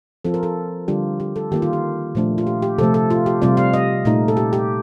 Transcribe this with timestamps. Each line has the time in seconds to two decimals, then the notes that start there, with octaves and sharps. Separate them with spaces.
0.25 F3 C4 F4 A4
0.34 A#4
0.43 A4
0.88 D3 G3 D4 F4 G4
1.20 G4
1.36 A4
1.52 D#3 A#3 F4 G4
1.62 F4
1.73 G4
2.15 A#2 F3 A3 D4
2.38 F4
2.47 G4
2.62 G4
2.78 C3 F3 A3 A4
2.94 A4
3.10 F4
3.26 G4
3.42 C3 G3 C4 F4 D5
3.57 F5
3.73 D#5
4.05 A#2 A3 D#4
4.28 A4
4.37 G4
4.53 G4